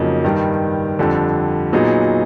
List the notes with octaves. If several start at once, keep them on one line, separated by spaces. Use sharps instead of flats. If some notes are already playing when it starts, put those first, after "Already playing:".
Already playing: F2 C#3 F#3 A#3 D#4
G2 D#3 G3
F2 D3 G3
A#2 F#3 B3 D#4 G#4